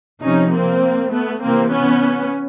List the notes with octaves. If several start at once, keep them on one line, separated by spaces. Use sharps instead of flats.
C3 F3 C#4 D#4
A#3 C4
A3 B3
C3 E3 A#3 C4
B3 C#4